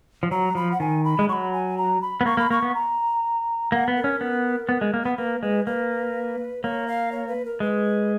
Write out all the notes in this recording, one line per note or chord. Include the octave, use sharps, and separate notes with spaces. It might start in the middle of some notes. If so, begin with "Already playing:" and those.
F3
F#3 A#5
F3 B5
F#5
D#3 G#5
B5
G#3
F#3 B5 C#6
G#5
A#5
B5
B3
A#3 C#6
A#3 B5
A#3 C#6
B3
A#5
A#3 F#5
B3
A#4
C#4
B3
B3
G#3
A#3
B3
A#3 B4
G#3 B4
A#3 B4
A#3 C#5
F5
C#5
B4
A#4
G#3 B4